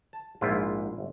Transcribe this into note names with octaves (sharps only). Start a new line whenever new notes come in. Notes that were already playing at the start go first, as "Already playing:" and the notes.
A5
A#1 G#2 E4 F4
G1